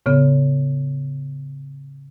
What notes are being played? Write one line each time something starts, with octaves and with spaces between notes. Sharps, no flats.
A2 C#3 B3